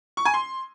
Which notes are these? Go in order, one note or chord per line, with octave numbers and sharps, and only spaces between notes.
C#6
G#5
C6